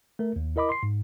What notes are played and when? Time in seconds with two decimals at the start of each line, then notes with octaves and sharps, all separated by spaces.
0.19 A3 A#4
0.36 D#2
0.56 E4 A#4 D#5 B5 D6
0.69 C6 C7
0.83 G#2